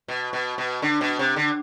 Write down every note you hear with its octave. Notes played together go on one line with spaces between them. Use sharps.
B2
B2
B2
D3
B2
C3
D3